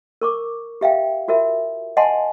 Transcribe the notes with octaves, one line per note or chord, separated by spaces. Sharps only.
A#4 C#6 D6
G4 E5 F5 G5
F4 F#4 A#4 E5
D#5 F#5 G#5 A5 C6